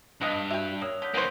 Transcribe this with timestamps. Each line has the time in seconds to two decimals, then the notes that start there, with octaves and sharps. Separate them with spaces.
0.21 G2 B2 D#5 F5 F#6 F7
0.50 F#4 E5 G5
0.82 A#3 C#5 D#6 E6
1.02 D3 G6 B6 G7
1.14 A#3 C#4 F#4 B4 C5 G6 D#7 G7